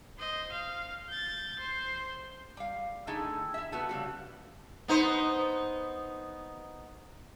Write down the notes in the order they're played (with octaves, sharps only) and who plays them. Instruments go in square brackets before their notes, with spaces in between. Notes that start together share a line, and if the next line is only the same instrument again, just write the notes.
[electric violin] C5 D#5
F5
G6 A6
C5
[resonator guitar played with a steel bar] G3 F5
D3 A3 D#4 E4 G#4 G5
E4 E5
A3 B3 F#4
C#3 G3 F#4
[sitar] B3 D#4 C5